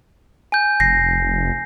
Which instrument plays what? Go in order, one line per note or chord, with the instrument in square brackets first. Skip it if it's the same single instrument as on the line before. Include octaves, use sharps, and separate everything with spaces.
[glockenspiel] G#5 G6
[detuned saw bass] F1 [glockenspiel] A#6 C7